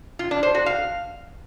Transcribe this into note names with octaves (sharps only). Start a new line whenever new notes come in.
F4
D4
C5
F#4
F5